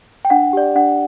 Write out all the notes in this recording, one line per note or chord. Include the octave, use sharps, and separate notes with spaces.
G5
D4 F#5
G4 D5
D4 F#5